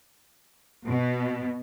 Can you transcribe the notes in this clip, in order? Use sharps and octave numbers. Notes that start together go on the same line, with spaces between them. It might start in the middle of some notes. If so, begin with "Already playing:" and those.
B2